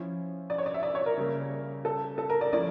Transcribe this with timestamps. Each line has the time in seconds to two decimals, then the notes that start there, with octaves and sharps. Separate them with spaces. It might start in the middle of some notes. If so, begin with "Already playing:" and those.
Already playing: F3 C#4 E4
0.50 D5
0.58 C#5
0.66 D5
0.74 E5
0.83 D5
0.95 C#5
1.06 A#4
1.17 C#3 G3 A#3
1.85 A4
2.18 A4
2.30 A#4
2.41 D5
2.52 F3 A3 C#4 E4 D5